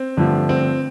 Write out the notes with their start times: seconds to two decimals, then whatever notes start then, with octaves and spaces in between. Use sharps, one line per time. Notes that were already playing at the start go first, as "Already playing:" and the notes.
Already playing: C4
0.17 G2 D3 F3 A3
0.49 C4